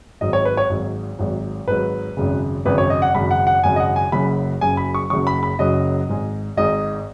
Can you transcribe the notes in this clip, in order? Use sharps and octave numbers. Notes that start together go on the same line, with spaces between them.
G#1 G#2 F#3 D#5
C#5
B4
C#5
G#1 G#2 F#3
G#1 G#2 F#3
G#1 G#2 F#3 B4
G#1 F#2 C#3
G#1 F#2 C#3 B4
C#5
D#5
F#5
G#1 F#2 C#3 B5
F#5
F#5
G#1 F#2 C#3 G#5
D#5
F#5
G#5
F#1 F#2 C#3 F#3 B5
F#1 F#2 C#3 F#3 G#5
B5
C#6
F#1 F#2 C#3 F#3 C#6
B5
B5
F#1 F#2 C#3 F#3 D#5
G#1 G#2 G#3
G#1 G#2 G#3 D#5